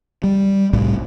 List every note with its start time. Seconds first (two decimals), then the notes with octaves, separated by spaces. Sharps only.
0.24 G3
0.73 C2 A2 G3